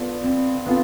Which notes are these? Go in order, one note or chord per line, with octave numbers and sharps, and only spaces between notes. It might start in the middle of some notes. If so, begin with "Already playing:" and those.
Already playing: B3 F4 A4 D5 F5
C4
B3 C4 F4 A4